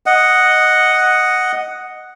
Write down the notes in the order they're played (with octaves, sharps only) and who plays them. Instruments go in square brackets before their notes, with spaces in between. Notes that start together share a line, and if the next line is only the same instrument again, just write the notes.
[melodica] D#5 F#5